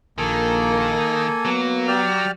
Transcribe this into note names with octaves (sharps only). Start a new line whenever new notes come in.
A#1 D#3 A#3 A4 G#5
F#3 B3
G4 D5 F6